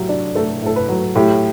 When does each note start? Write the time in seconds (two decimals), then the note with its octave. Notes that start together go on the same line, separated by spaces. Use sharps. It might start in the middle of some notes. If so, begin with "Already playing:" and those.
Already playing: A2 F#3 G4
0.09 D4
0.35 A3 A4
0.62 A2 A4
0.76 B4
0.89 F#3
1.15 A2 G4